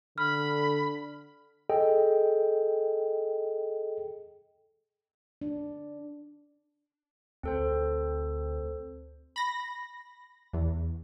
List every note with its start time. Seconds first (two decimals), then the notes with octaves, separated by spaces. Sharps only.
0.18 D3 B5 F6
1.69 G#4 A4 D#5 G5
5.42 D4
7.43 D2 C4 A4 C5
9.36 B5 A#6
10.53 E2